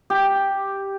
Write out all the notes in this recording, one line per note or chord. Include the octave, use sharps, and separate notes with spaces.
G4